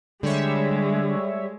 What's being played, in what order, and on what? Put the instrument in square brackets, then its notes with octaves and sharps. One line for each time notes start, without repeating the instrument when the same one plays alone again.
[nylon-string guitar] D3 [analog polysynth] G3 C#5 E5 [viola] G#3